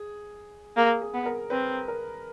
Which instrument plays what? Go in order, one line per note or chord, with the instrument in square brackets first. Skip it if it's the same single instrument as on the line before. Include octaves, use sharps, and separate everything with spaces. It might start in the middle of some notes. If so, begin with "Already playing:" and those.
Already playing: [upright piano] G#4
[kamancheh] A#3 [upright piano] G#4
[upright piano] G#4
[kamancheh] B3
[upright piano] A#4
[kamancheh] C4 [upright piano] B4
[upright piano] A#4